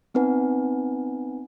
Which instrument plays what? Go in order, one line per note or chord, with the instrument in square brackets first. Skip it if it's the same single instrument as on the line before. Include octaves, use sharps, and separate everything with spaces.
[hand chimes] B3 C4 D#4 B4 F#5 G#5